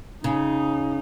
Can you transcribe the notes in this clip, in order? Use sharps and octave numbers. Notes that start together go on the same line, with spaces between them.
C#3 D#4